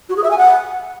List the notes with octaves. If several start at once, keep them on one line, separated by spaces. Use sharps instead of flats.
F#4
G#4
E5
G#5
F#5